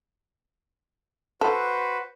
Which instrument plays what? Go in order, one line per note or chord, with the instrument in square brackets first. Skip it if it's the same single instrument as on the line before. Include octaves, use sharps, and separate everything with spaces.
[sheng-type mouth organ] F#4 B4 C5 [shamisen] A4